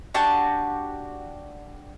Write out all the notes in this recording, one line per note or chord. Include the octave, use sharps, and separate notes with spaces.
D4 F#4 G4 A5